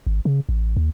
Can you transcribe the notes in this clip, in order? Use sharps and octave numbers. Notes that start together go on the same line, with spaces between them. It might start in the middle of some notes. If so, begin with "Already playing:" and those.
G#1
C#3
A1
D#2